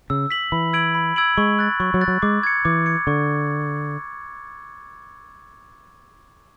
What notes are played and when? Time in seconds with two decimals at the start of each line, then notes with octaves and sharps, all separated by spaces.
0.10 C#3 E6
0.30 B6 F#7
0.52 E3 B5
0.73 E6 G#6 D7 F#7
0.95 B5
1.16 E6 G#6 D7 F#7
1.37 G#3 C#6
1.59 F#6 A6
1.80 F#3 C#6
1.94 F#3
2.01 F#6 A6
2.08 F#3
2.22 G#3 D6
2.43 G#6 C#7
2.65 E3 D6
2.86 G#6 C#7
3.07 D3 C#6